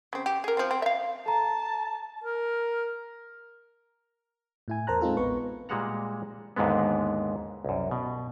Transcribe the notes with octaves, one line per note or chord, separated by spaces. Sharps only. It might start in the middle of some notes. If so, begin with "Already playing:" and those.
C#3 C4
G4
G#4 A#4
F3 C4
C4
E5 F5
A4 A5 A#5
A#4
A2 E4 G#5
E2 A#4 C5 A5 A#5 F#6
G#3 C4 D#4 F4 A4
A#1 B3 B4 C#6
A#2 G3 G#3 F#4 F#5 A#5
D#2 G#2 D3 G#3 B3
C2 F#2
B2